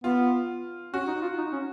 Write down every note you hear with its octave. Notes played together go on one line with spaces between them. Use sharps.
B3 F4
C#4 F#4
D#4
F4
D#4
C#4